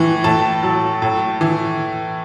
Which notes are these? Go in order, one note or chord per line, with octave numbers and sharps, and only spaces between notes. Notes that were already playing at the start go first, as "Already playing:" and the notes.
Already playing: A2 E3
A2 A5
F#3
A2
E3